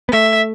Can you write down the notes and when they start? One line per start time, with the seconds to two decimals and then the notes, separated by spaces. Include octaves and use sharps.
0.09 B3
0.12 A3 E5